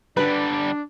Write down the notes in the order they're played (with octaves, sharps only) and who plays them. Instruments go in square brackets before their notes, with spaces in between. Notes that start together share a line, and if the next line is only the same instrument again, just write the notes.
[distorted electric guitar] D3 G3 [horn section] D4 [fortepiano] B4